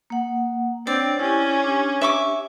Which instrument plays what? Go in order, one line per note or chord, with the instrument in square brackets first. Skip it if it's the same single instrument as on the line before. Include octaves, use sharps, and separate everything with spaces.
[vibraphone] A#3 F#5
[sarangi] C4 [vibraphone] D4 C#5 G5 [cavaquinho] D5
[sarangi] C#4 [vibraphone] E4 G4
[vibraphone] D4 G4
[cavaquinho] E5 C#6 D6